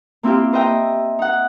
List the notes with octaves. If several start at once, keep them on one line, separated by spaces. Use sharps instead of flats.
A#3 C4 E4 F4 G4
B4 C5 D#5 E5 G5 A#5
D#4 F#5